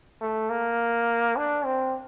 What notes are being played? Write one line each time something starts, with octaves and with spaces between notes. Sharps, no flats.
A3
A#3
D4
C4